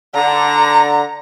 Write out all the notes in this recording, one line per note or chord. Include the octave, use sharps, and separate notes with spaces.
D3 A#5